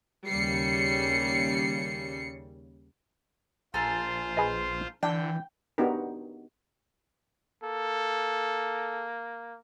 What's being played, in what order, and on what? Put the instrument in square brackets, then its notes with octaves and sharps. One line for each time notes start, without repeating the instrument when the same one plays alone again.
[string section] D#2 C#3 G3 C7 C#7
[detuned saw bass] A#1 [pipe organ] F4 C5 [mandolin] A4 G#5 A#5
[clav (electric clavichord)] G#4 B4 D#5
[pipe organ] D3 [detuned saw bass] E3 [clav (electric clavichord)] D4 [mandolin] G5
[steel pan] B3 D4 D#4 F#4 G4 A#4
[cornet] A#3 [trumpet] A4